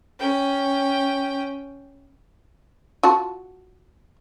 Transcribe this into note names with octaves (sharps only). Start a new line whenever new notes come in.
C#4 G5
F4 F#4 A5